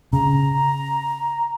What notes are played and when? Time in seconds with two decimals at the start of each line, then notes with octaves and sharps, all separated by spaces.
0.13 C#3 A#5